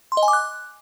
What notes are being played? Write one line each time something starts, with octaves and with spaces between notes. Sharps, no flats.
C6
D#5
G#5
D6
F#6